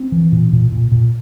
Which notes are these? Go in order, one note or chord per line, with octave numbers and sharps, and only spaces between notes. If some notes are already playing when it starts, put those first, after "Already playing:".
Already playing: C4
E3
A#2
A#2
A#2
A#2